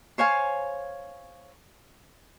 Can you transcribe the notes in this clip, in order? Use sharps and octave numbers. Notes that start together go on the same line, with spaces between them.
C5 C#5 F5 G#5